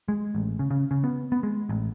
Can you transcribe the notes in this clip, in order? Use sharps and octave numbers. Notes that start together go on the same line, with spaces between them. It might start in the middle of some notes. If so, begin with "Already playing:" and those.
G#3
A1
C#3
C#3
C#3
B3
B3
G#3
A1